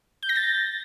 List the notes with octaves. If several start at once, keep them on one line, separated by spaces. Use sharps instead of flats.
G6
A#6
A6